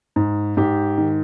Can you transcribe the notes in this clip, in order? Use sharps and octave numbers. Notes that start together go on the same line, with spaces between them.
G#2
G#2 G4
D#3